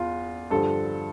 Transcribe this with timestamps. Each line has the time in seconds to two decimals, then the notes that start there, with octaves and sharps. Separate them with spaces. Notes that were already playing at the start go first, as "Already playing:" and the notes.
Already playing: E2 F4
0.51 G2 D3 F3 A4